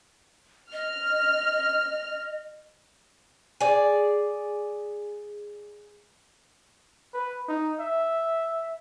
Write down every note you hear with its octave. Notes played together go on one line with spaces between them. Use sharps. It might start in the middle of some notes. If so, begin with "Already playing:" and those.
D#5 F6
G#4 D5
B4
D#4
E5